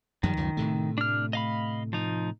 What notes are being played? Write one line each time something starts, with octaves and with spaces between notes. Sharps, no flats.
F#2 D#3 F3 G3
C#2 F#2 F3
A2 C3 A3
D4 F6
D#5 F5 B5
F3 D#4